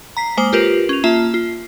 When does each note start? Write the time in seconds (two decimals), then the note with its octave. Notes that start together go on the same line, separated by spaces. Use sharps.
0.17 A#5 B6 C7
0.37 G#3 A#3 C5 D6
0.53 F4 G4 A#4 B4
0.89 C#4 F7
1.04 A#3 F4 E5 A5
1.34 F4